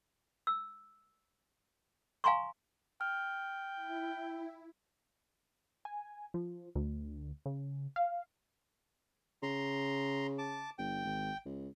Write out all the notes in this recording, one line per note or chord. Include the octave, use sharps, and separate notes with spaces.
E6
F5 G#5 A#5 C6 C#6
G5 F6
E4
G#5
F3
D2
C#3
F5
C#3 A#5 C6
A5 D6
G1 G5
G#1
C#2